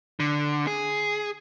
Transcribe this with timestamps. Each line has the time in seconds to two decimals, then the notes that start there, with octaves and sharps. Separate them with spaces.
0.20 D3
0.67 G#4